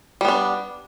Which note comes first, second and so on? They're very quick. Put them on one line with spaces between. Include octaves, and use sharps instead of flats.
G3 B3 D4